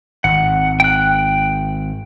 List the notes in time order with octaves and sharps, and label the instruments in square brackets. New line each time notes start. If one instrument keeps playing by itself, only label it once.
[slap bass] G#1 [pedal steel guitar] F#5
[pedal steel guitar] G5 F#6